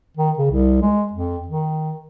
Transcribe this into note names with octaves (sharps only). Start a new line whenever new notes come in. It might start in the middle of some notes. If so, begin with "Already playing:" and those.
D#3
C#3
C2
G#3
F2
D#3